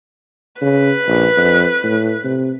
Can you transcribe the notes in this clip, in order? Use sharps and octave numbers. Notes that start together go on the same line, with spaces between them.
C#3 B4
A#1
F2
A2
C3